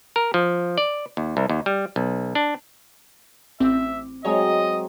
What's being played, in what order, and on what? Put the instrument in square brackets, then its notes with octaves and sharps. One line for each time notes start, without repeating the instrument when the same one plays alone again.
[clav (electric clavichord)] A#4
F3
D5
D#2
C2
D#2
G3
B1
D4
[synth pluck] A1 C4 [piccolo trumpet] E5 [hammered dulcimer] D6
[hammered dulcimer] F#3 G#3 C4 [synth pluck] C#5 [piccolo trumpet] D#5